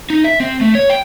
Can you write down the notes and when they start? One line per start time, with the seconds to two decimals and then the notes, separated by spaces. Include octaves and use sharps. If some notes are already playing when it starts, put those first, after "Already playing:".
0.10 D#4
0.24 E5
0.40 C4
0.61 A3
0.75 C#5
0.90 G5